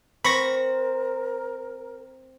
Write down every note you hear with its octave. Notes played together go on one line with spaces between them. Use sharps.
C4 A#4 B5 C#6 A#6